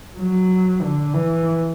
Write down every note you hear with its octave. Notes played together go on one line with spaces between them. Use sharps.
F#3
D3
E3